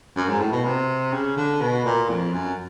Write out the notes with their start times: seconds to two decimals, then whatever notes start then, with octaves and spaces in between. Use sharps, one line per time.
0.16 F#2
0.28 G#2
0.40 A2
0.52 B2
0.65 C3
1.13 C#3
1.37 D3
1.61 B2
1.85 A#2
2.09 F2
2.33 F#2